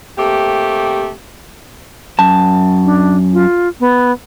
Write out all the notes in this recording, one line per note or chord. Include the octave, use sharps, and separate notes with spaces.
C3 A3 A#3 G4
F#2 A5
D4
F4
B3